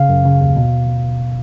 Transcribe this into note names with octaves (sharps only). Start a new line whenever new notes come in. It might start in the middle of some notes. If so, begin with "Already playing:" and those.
Already playing: C#3 F5
F#2
C#3
D#2
B2